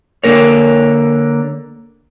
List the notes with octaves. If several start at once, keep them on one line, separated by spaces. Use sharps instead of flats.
D3 A#3 A#4 C#5